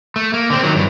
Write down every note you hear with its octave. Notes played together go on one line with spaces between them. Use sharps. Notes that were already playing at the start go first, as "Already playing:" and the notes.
A3
A#3
D3 C4
D#3 F#3
G2 E3